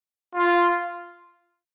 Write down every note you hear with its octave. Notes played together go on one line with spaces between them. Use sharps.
F4